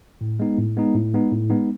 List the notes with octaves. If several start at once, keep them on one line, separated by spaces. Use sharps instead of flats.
A2
G#3 B3 D#4
A2
G#3 B3 D#4
A2
G#3 B3 D#4
A2
G#3 B3 D#4